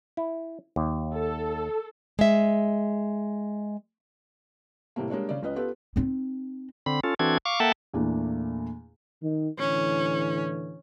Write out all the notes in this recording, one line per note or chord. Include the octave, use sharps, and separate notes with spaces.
E4
D#2
A4
G#3 E5
A2 C3 G3 A3 A#3
G3 G#3 A#3 D4 C#5
C#3 D5
C#2 C#4 B4 D#5
B3 F4 G4 A4 B4
C4 D#4
D3 C4 B5
C#4 F4 A4
E3 C4 D4 F#4 A4 G#6
F5 C#6 D6
A#3 A4 E5 F#5 G5 A5
E2 A#2 A3 A#3 D4
D#3
A2 D3 E3 C#4